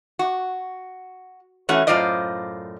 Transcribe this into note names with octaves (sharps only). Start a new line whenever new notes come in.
F#4
E3 A3 C#4 F#4
F#2 A2 F4 C5 D5 D#5